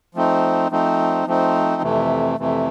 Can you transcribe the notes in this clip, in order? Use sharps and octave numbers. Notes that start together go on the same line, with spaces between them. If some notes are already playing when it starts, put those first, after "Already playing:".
F3 A3 C4 D#4
F3 A3 C4 D#4
F3 A3 C4 D#4
F2 C3 E3 A3
F2 C3 E3 A3